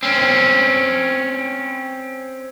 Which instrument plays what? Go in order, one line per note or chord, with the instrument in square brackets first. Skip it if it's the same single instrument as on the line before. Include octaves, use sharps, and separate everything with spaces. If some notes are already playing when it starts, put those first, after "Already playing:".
[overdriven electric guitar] C4 C#4